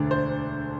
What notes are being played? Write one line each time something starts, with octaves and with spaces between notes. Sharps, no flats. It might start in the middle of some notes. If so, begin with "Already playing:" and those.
Already playing: E1 D2 D3 A3 D4
C5